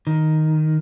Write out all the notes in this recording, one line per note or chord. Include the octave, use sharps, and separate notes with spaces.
D#3